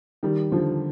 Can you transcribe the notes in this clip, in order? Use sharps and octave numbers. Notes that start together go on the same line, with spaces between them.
D#3 G3
D3 F3